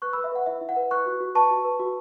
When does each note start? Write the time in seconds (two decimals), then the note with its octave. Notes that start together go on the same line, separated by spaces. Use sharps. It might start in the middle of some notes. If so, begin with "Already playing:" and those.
0.02 B4 C#6 F#6
0.13 B4 B5 E6
0.24 E5
0.32 B4 F#5
0.46 E4 E5
0.61 E4
0.69 F#5
0.76 B4
0.91 B4 C#6 F#6
1.06 F#4
1.21 F#4
1.35 B4 A5 C#6
1.51 F#4
1.64 B4
1.80 F#4